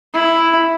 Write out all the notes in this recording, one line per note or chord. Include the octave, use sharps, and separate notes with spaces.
E4